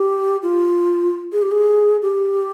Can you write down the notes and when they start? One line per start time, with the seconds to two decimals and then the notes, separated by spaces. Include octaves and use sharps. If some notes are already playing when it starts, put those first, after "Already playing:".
Already playing: G4
0.43 F4
1.32 G#4
1.42 G4
1.51 G#4
2.02 G4